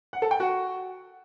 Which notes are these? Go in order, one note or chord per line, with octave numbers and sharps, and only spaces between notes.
F#5
A4
G5
F#4